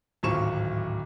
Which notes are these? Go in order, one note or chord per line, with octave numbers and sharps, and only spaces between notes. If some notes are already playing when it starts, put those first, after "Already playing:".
D1 G#1 F#3 F4 C#6 E7